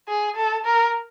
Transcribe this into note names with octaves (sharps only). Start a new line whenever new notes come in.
G#4
A4
A#4